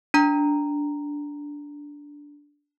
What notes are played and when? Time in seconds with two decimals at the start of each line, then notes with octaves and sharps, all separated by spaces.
0.14 D4 A#5